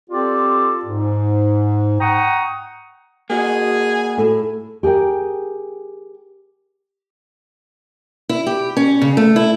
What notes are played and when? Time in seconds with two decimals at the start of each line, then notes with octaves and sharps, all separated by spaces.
0.10 C4 F4 G4 A4 D5
0.86 G#2
2.00 F#5 G5 A#5 C#6 D#6
3.30 A#3 F#4 G#4 D#5
4.18 A2 A4
4.83 G4 G#4 A#4 G5
8.29 E4
8.47 G4
8.77 C#4
9.01 C#3
9.17 A3
9.36 E4